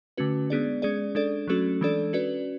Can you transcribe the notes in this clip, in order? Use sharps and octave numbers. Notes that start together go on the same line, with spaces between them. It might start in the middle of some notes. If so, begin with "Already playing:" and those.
D3 A3 C#4 F#4 B4
G#3 B3 D4 G#4 D5
G#3 C#4 G#4 D5
G#3 D4 A4 D5
F#3 A3 C#4 F#4 A4
E3 G#3 D4 A4 D5
C#4 F#4 B4 D5